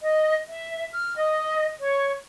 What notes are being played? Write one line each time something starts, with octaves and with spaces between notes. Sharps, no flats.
D#5
E5
F6
D#5
C#5